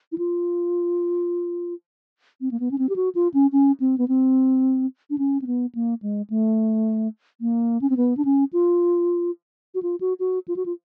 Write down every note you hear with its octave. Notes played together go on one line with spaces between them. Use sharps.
E4
F4
C4
A#3
B3
C#4
C4
G4
F#4
F4
C#4
C#4
C4
B3
C4
D4
C#4
C4
B3
A#3
G#3
A3
A#3
C#4
C4
B3
D4
C#4
F4
F#4
F4
F#4
F#4
F4
F#4
F4